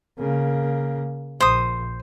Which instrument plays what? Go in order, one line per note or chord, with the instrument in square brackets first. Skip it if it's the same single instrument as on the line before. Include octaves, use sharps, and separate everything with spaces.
[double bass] C#3 A#3
[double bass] A#1 [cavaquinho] C5 D#6